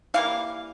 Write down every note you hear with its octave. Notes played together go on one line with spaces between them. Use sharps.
E3 G3 A#3 F5